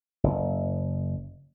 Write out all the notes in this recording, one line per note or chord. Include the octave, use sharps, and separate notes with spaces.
F#1